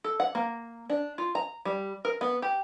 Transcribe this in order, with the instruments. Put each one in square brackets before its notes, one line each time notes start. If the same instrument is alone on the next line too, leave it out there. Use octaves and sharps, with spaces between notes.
[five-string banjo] A4
F#5
A#3
D4
F4
A#5
G3
A#4
B3
G4